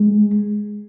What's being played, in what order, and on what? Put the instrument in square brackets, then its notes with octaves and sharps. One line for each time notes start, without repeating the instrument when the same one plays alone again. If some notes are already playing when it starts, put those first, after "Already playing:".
Already playing: [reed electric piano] G#3